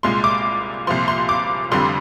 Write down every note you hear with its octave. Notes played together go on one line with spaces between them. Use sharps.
C2 A#2 G#3 C6
D6
C2 A#2 F3 C6
C6
D6
F1 F2 D3 G3 C6